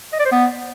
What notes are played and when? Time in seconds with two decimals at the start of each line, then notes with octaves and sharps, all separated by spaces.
0.13 D#5
0.19 D5
0.25 C5
0.32 B3